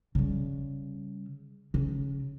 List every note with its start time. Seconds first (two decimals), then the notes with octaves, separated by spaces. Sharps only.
0.15 C#3 G3
1.74 C#3